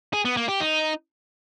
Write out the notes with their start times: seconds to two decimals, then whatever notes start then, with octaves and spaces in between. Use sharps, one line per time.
0.14 G#4
0.25 B3
0.37 A#3
0.49 G4
0.60 D#4